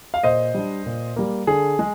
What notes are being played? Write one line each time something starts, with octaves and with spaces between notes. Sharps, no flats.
F5
A#2 C5 D#5
G3 D4
A#2
G3 A#3
D3 G#4
G#3